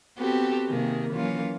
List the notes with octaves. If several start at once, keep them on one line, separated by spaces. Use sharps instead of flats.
B3 C4 F#4 G4 A4
C3 D#3 A#3 G#4
E3 F#3 A#3 C#4 F4